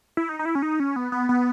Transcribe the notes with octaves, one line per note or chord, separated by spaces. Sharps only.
E4
D#4
D#4
E4
C#4
D#4
C#4
B3
B3
B3